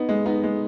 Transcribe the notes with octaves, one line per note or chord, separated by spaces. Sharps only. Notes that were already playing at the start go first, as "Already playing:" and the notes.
Already playing: B3 D#4
G#3
B3 D#4
G#3